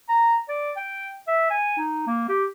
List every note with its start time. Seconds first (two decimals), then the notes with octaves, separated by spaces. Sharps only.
0.09 A#5
0.49 D5
0.76 G5
1.27 E5
1.50 G#5
1.78 D#4
2.07 A#3
2.29 G4